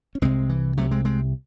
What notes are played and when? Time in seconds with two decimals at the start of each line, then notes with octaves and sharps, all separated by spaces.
0.15 C#4
0.22 C2 C3 G#3 C4
0.49 E3
0.77 C2 C3 F#3 A3
0.91 G#3 C4
1.05 G#3 C4